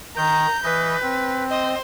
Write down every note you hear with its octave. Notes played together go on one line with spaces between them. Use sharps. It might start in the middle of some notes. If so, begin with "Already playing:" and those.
D#3 A#5 G6
E3 B4 D#5
C4
C5 D#5